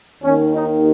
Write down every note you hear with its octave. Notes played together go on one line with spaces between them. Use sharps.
D#2 D#3 C#4
D#4